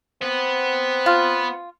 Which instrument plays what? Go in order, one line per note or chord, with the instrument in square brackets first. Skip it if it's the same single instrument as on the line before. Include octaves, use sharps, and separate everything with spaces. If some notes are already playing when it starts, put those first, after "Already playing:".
[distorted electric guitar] B3 [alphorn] C4
[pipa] F4